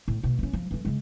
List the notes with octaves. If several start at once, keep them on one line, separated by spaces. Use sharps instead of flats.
A2
B2 A3
E3 C#4
F3
D3 E3
C#3 G#3